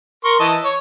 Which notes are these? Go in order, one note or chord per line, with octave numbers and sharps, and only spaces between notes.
A#4 C6 C#6
E3 D#5 A5
C#5